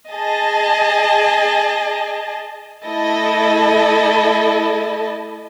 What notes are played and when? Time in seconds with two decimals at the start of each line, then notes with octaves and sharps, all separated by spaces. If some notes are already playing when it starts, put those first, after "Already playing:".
0.11 G#4 D#5 A5
2.85 A3 E4 A4 D#5 A5